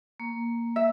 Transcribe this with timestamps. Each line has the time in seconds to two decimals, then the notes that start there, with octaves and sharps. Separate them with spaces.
0.20 A#3
0.76 E5